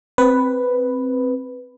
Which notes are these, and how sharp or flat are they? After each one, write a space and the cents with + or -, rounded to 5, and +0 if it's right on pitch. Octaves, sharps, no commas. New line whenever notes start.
C4 +0 B4 +0